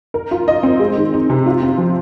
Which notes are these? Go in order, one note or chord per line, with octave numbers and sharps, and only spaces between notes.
A#4
F4
D#5
C4
G#3
D#3
D#4
C3
F4
C4
F3